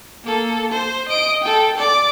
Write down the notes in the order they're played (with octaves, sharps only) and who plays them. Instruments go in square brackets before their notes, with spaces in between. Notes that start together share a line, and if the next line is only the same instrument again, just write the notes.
[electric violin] A#3 A4
C5
D#5 D7
A4 G5
D5 D6